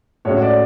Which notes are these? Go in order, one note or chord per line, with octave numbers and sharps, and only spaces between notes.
A2 G#3 C#4 F#4 C#5
D5